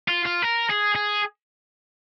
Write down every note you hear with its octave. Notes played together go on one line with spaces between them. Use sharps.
F4
F4
A#4
G#4
G#4